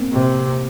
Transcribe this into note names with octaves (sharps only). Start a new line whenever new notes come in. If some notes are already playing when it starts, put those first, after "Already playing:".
Already playing: A#3 C4
C3